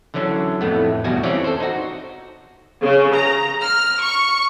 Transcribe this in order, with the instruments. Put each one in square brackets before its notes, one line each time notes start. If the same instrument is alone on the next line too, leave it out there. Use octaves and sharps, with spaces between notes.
[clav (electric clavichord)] D3 E3 F#3 C#4 D4
F2 A2 A3 B3
E2 B2 G3 F#4 G#5
E3 C4 C#4 F4 C#5 D5
A4 C5
D#4 F#4
[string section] C#3
A#5
F6
C#6